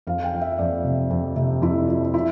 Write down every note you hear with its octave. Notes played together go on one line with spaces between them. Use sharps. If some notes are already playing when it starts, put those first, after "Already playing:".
F2 F5
G5
F3
E5
F2 D5
C3
F2
C3
F2 E4
F3
F3 E4